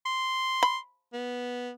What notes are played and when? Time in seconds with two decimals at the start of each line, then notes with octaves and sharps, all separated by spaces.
0.06 C6
0.63 B5
1.13 B3